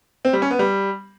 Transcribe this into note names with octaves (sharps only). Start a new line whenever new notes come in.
C4
G3
C#4
B3
G3